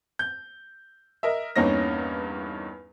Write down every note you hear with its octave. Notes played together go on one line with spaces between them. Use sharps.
G6
A#4 D#5 E5
E2 G2 A#3 C#4 D#4 A#6